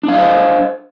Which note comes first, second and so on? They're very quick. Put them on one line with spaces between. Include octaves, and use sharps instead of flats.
D4 F5 D#5 C5